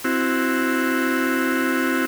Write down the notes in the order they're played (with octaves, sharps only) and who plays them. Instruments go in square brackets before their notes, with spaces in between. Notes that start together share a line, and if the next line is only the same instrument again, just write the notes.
[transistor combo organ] C4 E4 F#4